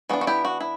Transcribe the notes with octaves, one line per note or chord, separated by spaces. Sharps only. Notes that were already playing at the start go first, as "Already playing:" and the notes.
E3 B3 D4 F#4
F#4
E4 G4
F#4
E4